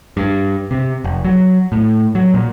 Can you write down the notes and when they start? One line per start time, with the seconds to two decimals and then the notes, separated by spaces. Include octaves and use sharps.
0.17 G2
0.71 C3
1.04 F1
1.24 F#3
1.72 A2
2.15 F#3
2.34 A#2